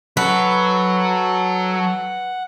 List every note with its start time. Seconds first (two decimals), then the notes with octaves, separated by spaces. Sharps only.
0.17 F#3 F#4 A4 B4 F#5